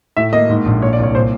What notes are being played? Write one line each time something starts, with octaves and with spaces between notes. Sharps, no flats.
A2 E5
A#3 D#5
G#2
A#1
A#2 C#5
D5
C2 C#5
A#2 C5